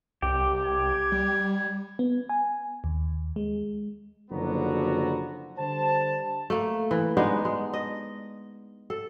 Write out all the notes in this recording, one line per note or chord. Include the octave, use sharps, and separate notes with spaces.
C2 G4
G#6
G3
B3
G#5
D#2
G#3
F#1 D3 F3 B3 F#4 A#5
D3 G3 C5 A5
A3 A#3
E3
G#3 B3 D4 D#4
G#3
D#5
A4